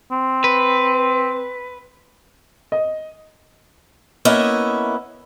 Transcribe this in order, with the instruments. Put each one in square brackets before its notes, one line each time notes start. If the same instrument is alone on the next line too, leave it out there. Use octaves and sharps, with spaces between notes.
[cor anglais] C4
[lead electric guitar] B4
[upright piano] D#5
[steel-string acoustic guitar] A#3 B3 C#4 E4 D#5 E5